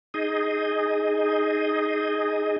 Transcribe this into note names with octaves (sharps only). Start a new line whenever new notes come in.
D#4 G#4 D#5